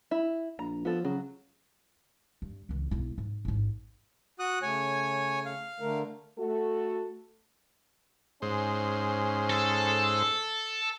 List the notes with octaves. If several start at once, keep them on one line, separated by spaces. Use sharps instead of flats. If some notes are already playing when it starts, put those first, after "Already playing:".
E4
A#1 A#5
F3 B3 A4
C#3 F#3
G2
C#2 E3
B1 E4
G#2
A1 G#2
F#4 D#6 F#6
C#3 A3 C#5 G#5
F5
D3 A3 A#4
A3 F#4 A4
G#2 C#4 C5
A4